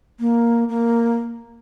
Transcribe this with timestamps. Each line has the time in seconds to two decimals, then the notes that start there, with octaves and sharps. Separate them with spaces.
0.20 A#3
0.69 A#3